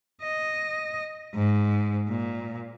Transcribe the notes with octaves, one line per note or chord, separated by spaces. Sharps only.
D#5
G#2
A#2